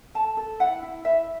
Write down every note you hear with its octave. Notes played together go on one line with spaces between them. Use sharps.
A4 A5
A4
E4 F#5
E4
E4 E5